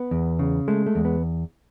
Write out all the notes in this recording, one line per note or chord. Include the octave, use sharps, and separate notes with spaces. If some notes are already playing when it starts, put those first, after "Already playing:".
Already playing: B3
E2
C#3
G#3 A3
A3
E2
B3